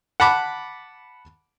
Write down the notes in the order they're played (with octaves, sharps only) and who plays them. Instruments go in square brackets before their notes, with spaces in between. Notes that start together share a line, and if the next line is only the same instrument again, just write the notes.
[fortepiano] F#5 A5 B5 D6